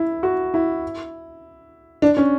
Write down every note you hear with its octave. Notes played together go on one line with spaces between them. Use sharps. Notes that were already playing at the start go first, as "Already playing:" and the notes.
Already playing: E4
F#4
E4
D4
C#4